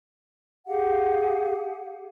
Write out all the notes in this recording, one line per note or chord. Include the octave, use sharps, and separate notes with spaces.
G4 G#4 F5 F#5